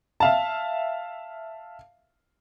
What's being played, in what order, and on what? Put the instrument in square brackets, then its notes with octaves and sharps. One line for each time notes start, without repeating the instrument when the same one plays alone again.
[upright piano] E5 F5 A5